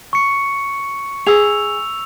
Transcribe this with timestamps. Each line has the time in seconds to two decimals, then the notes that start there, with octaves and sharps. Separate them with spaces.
0.13 C#6 C#7
1.27 G#4 E6 F7